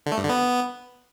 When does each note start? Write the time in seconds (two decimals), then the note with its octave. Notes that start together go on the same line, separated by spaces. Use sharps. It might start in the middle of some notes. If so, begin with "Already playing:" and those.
0.06 D3
0.12 A3
0.18 G2
0.23 D3
0.29 B3